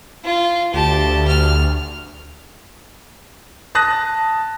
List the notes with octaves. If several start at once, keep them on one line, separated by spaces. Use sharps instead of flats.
F4
D2 G4 A5
F6
A5 D#6 F#6 A#6